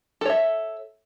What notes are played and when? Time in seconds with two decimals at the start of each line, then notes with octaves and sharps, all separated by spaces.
0.21 A4
0.25 C#5
0.30 E5